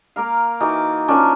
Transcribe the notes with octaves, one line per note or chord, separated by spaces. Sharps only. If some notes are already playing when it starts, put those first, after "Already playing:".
A#3 A#4 F5
E3 D#4 F#4 D6
F3 C#4 D4 A#4